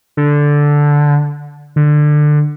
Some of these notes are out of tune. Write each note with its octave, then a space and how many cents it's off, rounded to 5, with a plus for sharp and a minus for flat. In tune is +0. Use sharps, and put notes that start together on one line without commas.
D3 -5
D3 +20